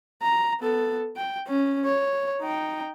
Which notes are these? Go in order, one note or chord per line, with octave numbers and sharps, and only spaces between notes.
A#5
B3 A4
G5
C#4
C#5
D#4 G5